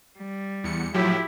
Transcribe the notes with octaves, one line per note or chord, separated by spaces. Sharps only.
G3
E2 C#7
A2 F3 F#3 E4 G4